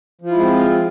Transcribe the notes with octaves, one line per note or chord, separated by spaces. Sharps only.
F3 G#3 C4 E4 F4